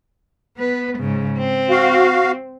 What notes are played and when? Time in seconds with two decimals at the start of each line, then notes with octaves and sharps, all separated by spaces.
0.57 B3 B4
0.99 G#2 C#3
1.39 C4
1.70 F#4 F5